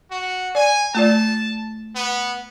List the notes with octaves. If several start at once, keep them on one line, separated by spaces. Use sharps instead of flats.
F#4
D5 G#5
A3 F4 D5 A5
B3